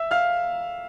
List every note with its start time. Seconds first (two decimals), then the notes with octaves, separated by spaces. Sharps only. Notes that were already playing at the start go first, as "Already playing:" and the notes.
Already playing: E5 E6
0.11 F5 F6